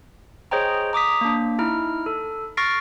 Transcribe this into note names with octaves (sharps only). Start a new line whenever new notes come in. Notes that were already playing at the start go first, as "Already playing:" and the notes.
G#4 C5 C#5 D#5 G5 A#5
A#5 D6 D#6 B6
A#3 D4
D#4 E4 F6
A4
C#6 F6 A6 A#6 C7 D7